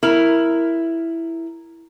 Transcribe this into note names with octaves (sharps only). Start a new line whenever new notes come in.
E4 A#4